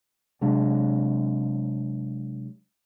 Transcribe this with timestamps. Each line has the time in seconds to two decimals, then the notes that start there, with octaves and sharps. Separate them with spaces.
0.41 C3 F#3 G#3 D4